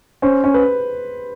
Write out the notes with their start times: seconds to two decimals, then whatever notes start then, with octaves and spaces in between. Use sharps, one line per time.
0.22 C#4 C5
0.44 C#4
0.54 B4